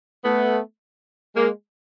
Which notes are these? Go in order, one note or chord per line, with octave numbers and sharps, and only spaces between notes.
A3 B3
G#3 A#3